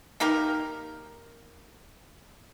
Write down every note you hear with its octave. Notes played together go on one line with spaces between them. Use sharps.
A#3 D#4 G4 A#4